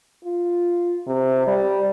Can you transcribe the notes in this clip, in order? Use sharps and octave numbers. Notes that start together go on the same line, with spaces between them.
F4
C3
G3